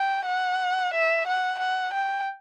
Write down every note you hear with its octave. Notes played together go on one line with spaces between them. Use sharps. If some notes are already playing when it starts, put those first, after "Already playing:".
Already playing: G5
F#5
E5
F#5
F#5
G5